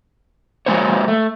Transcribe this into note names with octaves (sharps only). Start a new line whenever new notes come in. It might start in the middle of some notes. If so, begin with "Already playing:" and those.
F#3 G#3 A#3 C5 C#5
A3